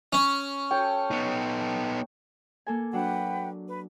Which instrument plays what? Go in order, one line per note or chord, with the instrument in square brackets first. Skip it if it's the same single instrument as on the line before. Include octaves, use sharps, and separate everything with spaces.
[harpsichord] C#4
[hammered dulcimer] A4 C#5 G5
[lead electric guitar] B3 D#4
[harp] A#3 A4 G#5
[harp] F#3 D4 [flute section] B4 F#5 G5
[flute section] B4